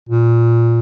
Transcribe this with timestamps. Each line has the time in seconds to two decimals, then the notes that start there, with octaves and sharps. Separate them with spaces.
0.09 A#2